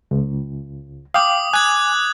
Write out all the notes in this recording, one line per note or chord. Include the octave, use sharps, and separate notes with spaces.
C#2
F5 G5 D6 D#6
G#5 F#6 G#6